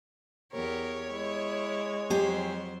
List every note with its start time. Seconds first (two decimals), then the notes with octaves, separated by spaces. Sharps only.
0.53 E2 G4 A#4 C#5
1.12 G#3 E4
2.10 F2 F#3 G4 G#4 C5